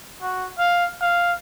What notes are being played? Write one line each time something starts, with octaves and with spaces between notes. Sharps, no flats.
F#4
F5
F5